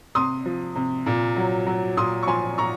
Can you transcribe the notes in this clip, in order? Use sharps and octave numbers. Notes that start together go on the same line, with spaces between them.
C3 C6 D#6
F3
C3
A#2
F#3
F#3
A#2 C6 D#6
C#6
F3 G#5 C6
A#2 A#5 C#6